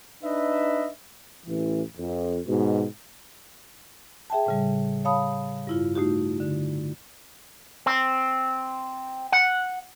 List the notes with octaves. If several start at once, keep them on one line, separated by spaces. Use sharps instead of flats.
D4 D#4 B4 D#5 E5
A1 E3
F2
G#2 B2
G#4 E5 G5 A5
A2 C#3 G3
C#5 F5 A5 B5 D#6
G2 E4 F4
A3 D#4 F#4 G4
D3
C4
F#5